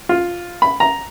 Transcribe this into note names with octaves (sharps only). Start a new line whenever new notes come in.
F4
B5
A#5